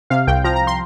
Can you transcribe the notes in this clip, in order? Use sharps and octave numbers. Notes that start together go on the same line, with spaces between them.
C3 F5
C2 G5
F3 A#5
A#5
C6